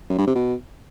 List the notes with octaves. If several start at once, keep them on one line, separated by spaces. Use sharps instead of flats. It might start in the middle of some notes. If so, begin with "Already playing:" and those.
F#2
G2
C3
B2